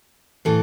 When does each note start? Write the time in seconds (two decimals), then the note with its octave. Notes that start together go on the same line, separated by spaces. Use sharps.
0.45 A2 E3 A4